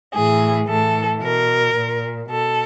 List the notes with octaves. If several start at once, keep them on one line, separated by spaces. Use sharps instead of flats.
A2 E3 G#4
A2 E3 A4
B2 A#4
A#2
B2 A4